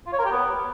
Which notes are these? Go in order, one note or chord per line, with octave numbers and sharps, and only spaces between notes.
F4
C#5
A#4
G4
B3